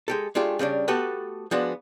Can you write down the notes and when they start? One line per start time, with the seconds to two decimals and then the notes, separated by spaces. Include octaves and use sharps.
0.08 G#3 G4 A4
0.35 G#3 A3 D4 F4 G4
0.59 C#3 G3 C#4 D4
0.88 A3 B3 F#4 G4 A4 B4
1.51 F3 G#3 B3 D4 F#4